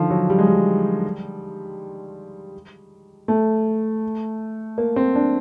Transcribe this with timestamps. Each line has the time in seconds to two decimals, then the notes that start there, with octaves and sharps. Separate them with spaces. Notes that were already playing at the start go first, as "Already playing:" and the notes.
Already playing: D3 D#3 F3
0.10 F#3
0.30 G3
0.39 G#3
0.47 G3
3.28 A3
4.78 A#3
4.96 C4
5.15 D4